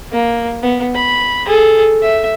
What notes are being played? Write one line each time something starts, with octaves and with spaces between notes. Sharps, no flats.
A#3
B3
B5
G#4 A4
E5